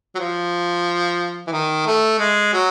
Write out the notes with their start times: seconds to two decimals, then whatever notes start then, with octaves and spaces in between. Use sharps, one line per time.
0.15 F#3
0.19 F3
1.47 E3
1.52 D#3
1.87 A3
2.19 G#3
2.53 F#3